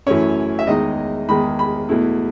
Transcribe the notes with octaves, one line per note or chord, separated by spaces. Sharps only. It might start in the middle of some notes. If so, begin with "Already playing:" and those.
F#2 E3 A3 C#4 E4 C#5
E5
E2 D#3 G#3 D#4 D#5
E2 D#3 G#3 D#4 B5
B5
E2 B2 A3 E4